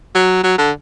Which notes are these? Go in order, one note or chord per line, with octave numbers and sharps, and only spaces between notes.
F#3
F#3
D3